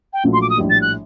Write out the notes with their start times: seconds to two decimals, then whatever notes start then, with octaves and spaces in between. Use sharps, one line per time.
0.13 G5
0.24 A#1 A#2 F#3 A3
0.33 C6
0.41 D6
0.50 D#6
0.58 A#1 A2 G3
0.70 A6
0.81 F#6